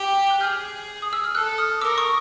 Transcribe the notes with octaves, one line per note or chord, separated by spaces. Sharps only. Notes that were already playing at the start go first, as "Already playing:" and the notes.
Already playing: G4
F#6
G#4 F6 G6
D#6
E6
F6
A4 E6 F#6
D#6 F6
A#4 D6 E6
C#6 D#6